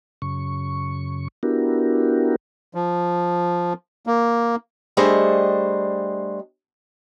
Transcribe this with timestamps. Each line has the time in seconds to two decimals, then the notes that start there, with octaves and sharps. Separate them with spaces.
0.22 F#2 C#3 C#6
1.43 B3 D4 E4 F#4 G4 A#4
2.74 F3
4.07 A#3
4.97 G3 A3 D4 G#4 C5 D#5